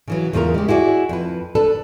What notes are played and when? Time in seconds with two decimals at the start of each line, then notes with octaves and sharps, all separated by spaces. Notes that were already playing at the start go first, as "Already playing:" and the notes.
0.08 C#3 E3 F#3
0.33 E2 C#3 F4 A4 A#4
0.54 G#3 G4
0.68 E4 F#4 G#4 D5
1.09 F2 B4
1.55 D4 A4 B4